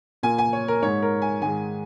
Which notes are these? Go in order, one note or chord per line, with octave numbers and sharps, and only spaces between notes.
A#2 A#3 G#5
G#5
C#5
A#4
G#2 G#3 C#5
A#4
G#5
G#2 D#3 G#3 G#5